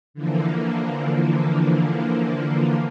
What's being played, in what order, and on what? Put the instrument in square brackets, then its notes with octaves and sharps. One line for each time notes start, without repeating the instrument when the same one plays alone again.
[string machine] D3 E3 F3 A#3